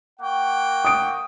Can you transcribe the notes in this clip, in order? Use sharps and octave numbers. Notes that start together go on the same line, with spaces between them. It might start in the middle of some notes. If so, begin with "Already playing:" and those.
A#3 F#5 G5 C#6
D#6 D7